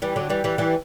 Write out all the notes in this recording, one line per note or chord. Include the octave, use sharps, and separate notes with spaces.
E3 G3
D3 F#3
E3 G3
E3 G3
E3 G3